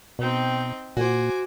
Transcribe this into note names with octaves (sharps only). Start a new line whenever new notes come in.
B2 C4 D#4 G5
A#2 F#4 C5 G#5 D6